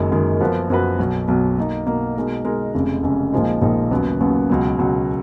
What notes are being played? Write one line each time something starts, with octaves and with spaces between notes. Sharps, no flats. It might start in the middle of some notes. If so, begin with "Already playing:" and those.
Already playing: F#1 F#2 D#3 G#3
F#1 F#2 D#3 G#3
F#2 F3 B3 F#4 B4
F#2 F3 B3 F#4 B4
B1 B2 F#3
B1 B2 F#3
B2 A#3 D#4
B2 A#3 D#4
B2 G#3 D#4 A#4
B2 G#3 D#4 A#4
F1 F2 C#3 G#3
F1 F2 C#3 G#3
A#1 A#2 F3 G#3 D#4
A#1 A#2 F3 G#3 D#4
D#2 C#3 F#3 B3
D#2 C#3 F#3 B3
C#2 B2 F#3
C#2 B2 F#3